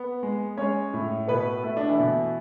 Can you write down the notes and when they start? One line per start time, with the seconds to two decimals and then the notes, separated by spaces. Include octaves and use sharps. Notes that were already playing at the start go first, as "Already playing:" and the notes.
Already playing: B3
0.23 G#3
0.57 G#3 C#4 C#5
0.93 A2
1.28 B2 B3 B4
1.63 A3 E4
1.77 D4
1.89 E3 E4
1.99 B2